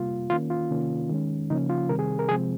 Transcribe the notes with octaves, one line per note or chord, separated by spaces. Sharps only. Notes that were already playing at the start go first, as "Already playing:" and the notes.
Already playing: C3 G3 A#3 F4
D#3 A#3 C#4 F4
F4
C3 D#3 A#3 C#4
D#3 G#3 C#4
C#3 F3 A#3 C#4 D#4
F4
C3 D#3 G3 C4 A#4
G#4
A#4
C3 F3 G#3 C4 G#4